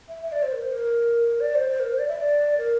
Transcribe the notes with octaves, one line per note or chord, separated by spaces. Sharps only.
E5
E5
D5
C5
A#4
C5
A#4
D5
C5
C5
A#4
C5
D5
E5
D5
A#4